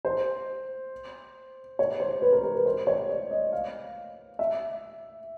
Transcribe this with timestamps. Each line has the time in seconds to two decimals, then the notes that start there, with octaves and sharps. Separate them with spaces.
0.05 C5
1.79 C#5
2.00 C5
2.22 B4
2.33 A#4
2.43 A#4
2.55 B4
2.66 C5
2.87 C#5
3.09 D5
3.31 D#5
3.53 F5
4.39 E5